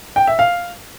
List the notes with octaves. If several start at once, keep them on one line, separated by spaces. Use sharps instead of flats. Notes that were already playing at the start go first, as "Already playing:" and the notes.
G5
E5
F5